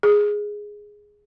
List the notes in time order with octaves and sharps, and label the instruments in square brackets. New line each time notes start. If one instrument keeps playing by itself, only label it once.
[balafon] G#4